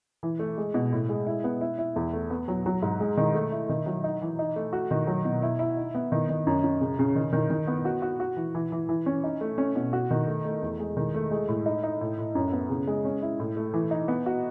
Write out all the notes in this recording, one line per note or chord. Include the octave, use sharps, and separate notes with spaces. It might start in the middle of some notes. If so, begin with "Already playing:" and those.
E3
A3
G#3
B2
A2
G#3
E4
B3
E4
E4
E2
A3
B3
F#3
F#3
G#2
G#3
D#3
A3
E4
D#3
F#3
D#4
E3
D#4
A3
F#4
D#3
F#3
B2
E4
E4
D#4
B3
D#3
D#3
F#2
F#2
C#3
C#3
D#3
D#3
D#3
B3
F#4
F#4
F#4
E3
E3
E3
E3
C#4
D#4
A3
C#4
B2
F#4
D#3
A3
A3
E2
G#3
D#3
A3
G#3
A2
D#4
D#4
A2
A2
F#2
B3
C#3
G#3
C#4
E4
A2
A3
E3
D#4
B3
F#4